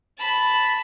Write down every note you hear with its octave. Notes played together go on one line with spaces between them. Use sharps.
A5 B5